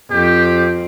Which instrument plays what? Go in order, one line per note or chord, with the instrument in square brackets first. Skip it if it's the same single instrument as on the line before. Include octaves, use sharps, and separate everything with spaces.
[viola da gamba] F2 C4 [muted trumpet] G4